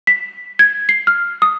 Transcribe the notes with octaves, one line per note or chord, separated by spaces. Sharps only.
B6
G#6
C7
F6
D#6